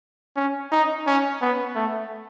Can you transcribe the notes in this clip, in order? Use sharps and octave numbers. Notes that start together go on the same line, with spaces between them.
C#4
D#4
C#4
B3
A3